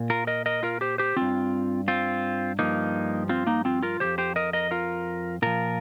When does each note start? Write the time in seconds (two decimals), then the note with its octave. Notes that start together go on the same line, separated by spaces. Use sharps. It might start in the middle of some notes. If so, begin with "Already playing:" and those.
Already playing: A#2
0.10 F4 A#4
0.27 A#4 D#5
0.46 A#4 D#5
0.63 F4 A#4
0.81 G4 C5
0.98 G4 C5
1.16 G2 D#3 C4 F4
1.88 C4 F4
2.59 G2 F3 A#3 D#4
3.29 C4 F4
3.47 A#3 D#4
3.65 C4 F4
3.83 F4 A#4
4.00 F2 D#3 G4 C5
4.18 G4 C5
4.36 A#4 D#5
4.53 A#4 D#5
4.71 F4 A#4
5.42 A#2 F3 F4 A#4